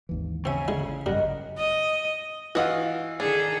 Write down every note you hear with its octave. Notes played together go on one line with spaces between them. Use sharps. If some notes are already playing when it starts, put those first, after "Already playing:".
G#1 D#2 E3
C#3 C4 C#5 E5 G#5
D3 G#3 E4
G#1 F#2 G3 D4 A#4 D#5 F#5
D#5
E3 F4 F#4 D#5 F#5
D#3 D4 G#4 A4